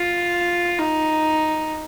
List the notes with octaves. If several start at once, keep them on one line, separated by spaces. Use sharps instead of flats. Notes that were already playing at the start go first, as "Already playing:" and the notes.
Already playing: F4
D#4